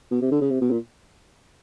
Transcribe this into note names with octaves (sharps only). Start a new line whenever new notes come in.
B2
C3
D3
C#3
C3
B2
A#2